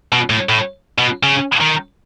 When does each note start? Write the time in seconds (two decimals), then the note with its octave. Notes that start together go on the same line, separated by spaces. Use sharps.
0.12 B2
0.30 A2
0.49 A2
0.98 B2
1.23 C#3
1.61 D#3